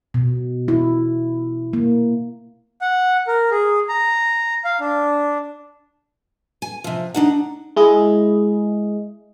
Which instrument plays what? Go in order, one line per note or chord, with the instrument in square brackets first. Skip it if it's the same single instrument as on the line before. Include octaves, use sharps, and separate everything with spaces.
[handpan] B2
E4
A#3
[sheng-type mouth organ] F#5
A#4
G#4
A#5
F5
D4
[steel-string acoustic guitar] G#5
C3 F3
D4 D#4 F#5
[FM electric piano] G#3 E4 G#4 D#5